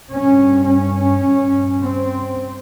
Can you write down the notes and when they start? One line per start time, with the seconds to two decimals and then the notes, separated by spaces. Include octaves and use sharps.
0.14 G2 C#4
0.69 C#4
1.25 G2
1.80 C4